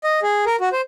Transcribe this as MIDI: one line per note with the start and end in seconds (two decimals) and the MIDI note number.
0.04 0.20 75
0.23 0.45 68
0.46 0.56 70
0.61 0.69 66
0.72 0.81 72